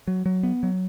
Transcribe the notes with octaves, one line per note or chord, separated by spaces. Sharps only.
F#3
F#3
B3
F#3